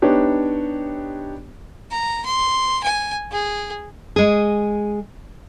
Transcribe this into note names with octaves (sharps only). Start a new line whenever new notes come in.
B3 D4 D#4 G4 C#5
A#5
C6
G#5
G#4
G#3 G#4